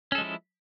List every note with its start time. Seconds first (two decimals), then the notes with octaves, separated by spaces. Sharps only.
0.12 C#4
0.15 A4
0.18 G#3
0.21 F3
0.24 E4